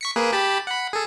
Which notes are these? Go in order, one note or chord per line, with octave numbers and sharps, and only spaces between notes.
C#6 B6 C#7
A#3 G#4 B4
G4 A5 B5
F#5 B5
G#4 A4